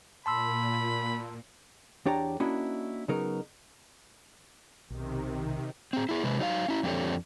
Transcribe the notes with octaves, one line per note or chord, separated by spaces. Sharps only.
A#2 A5 B5 C6 E6
E2 D4 G4 C#5 D5 A#5
A#3 C#4 D4 E4 F#4 D#5
C#3 F#3 B3 D#4 A#4
B1 C3 D#3
C4 G#4
E4 G#4
C3 G#3 B4
F#3 D#4 D5 F5
C#4 E4
F2 C4 D4 G4 A4 C#5